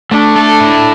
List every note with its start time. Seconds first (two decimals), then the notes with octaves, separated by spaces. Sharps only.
0.11 A3 D4
0.36 A4
0.60 E4